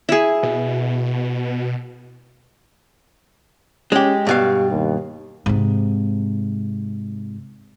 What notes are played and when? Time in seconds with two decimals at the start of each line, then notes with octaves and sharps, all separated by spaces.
0.09 E4 G#4
0.43 B2
3.92 G#3 C#4 G4
4.27 G2 B2 G4 F5
4.71 D#2
5.46 G#2 C3